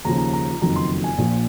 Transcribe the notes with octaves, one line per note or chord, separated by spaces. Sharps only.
D#2 C#3 F3 A#5
A#5
A#5
F#1 F2 D#3 F#3 A#5
C6
G#5
A#1 A#2 F3